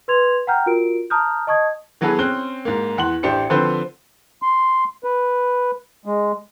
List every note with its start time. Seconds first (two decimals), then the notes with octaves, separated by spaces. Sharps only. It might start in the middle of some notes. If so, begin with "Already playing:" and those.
0.08 B4 C6 G#6 F7
0.47 F#5 G5 A#5 F6 G6
0.66 F4 F#4 A#4 D7
1.10 A5 A#5 D#6 F6 G6
1.47 D#5 A5 C#6 D#6 G#6
2.01 E3 F#3 B3 G#4 A4 B4
2.19 C4 C#4 F#6 G7
2.65 G#2 A#3
2.98 E2 F#5 C6 F#7
3.23 A1 D4 G4 C5 C#7
3.50 D3 F3 C4 B4 C5
4.42 C6
5.04 B4
6.06 G#3